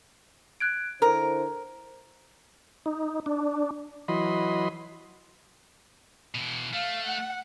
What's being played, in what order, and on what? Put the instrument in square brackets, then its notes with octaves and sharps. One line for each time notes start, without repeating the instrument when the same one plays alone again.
[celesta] F#6 G#6 D7
[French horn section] D3 E4 C5 [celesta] A4 [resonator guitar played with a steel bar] A#4
[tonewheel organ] D#4
D4
[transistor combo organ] E3 F#3 D#5 B5 C6
[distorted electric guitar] B2 E3
[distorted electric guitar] A3 [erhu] F5
[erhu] F#5